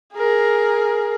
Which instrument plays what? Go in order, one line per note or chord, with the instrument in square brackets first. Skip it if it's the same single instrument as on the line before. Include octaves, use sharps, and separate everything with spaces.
[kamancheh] G#4 A#4